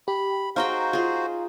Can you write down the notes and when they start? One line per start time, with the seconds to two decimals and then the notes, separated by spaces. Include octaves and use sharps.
0.08 G4 B5
0.56 D#4 F#4 G#4 C5 F5 G5 A#5
0.93 F4 G#4